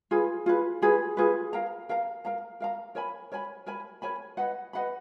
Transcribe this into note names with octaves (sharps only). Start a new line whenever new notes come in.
F4 G#4 B4
F4 G#4 B4
F4 G#4 B4
F4 G#4 B4
A#4 F5 A#5
A#4 F5 A#5
A#4 F5 A#5
A#4 F5 A#5
A#4 C#5 G#5 B5
A#4 C#5 G#5 B5
A#4 C#5 G#5 B5
A#4 C#5 G#5 B5
B4 D#5 F#5 B5
B4 D#5 F#5 B5